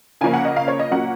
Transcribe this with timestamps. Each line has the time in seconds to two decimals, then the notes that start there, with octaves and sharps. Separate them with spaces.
0.21 C#3 F3 A#3 C#4 G#5
0.33 F#5
0.45 D#5
0.56 F5
0.68 C#5
0.79 D#5
0.91 A#2 F#3 A#3 C#4 F#5